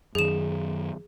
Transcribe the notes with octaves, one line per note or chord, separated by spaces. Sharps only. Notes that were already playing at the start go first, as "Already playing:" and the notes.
F#2 D#3 G#4 E7